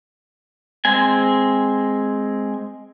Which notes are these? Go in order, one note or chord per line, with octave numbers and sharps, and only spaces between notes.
G#3 C4 G#5